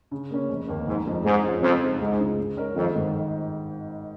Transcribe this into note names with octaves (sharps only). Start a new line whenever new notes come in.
C#3
A#3 C#4
F1
D#2 D#3 A#3
F1 G#2
F2 F3 G#3 D#4
F2 G#2
F3 G#3 C#4 F4
F2 C#3
G#3 D#4 G#4
C#2 G#2
C#3 G#3 F4
G#2
G#3 C#4 A#4
G#1 F2
G#2 D#3